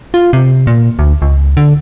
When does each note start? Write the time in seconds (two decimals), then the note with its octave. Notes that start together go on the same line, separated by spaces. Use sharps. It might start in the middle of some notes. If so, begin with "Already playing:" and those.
0.14 F4
0.33 C3
0.67 A#2
0.99 D2
1.22 C#2
1.57 D3